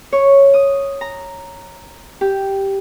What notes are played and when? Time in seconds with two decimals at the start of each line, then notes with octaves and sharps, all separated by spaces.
0.13 C#5
0.54 D#6
1.01 A#5
2.21 G4